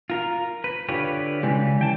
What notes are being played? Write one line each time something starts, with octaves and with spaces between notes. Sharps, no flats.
F4 A#4
B4
D3 F4 G4 B4 C#5
C#3 E3 G3 G#3
E3 G5 A5